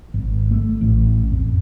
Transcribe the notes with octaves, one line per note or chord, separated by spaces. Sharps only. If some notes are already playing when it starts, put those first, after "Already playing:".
G#1
A3
A1
F2